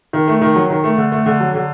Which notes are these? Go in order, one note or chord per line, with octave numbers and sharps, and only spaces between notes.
D#3
A3
D#3
F#3
D#3
A3
D3
A3
D3
F#3
D3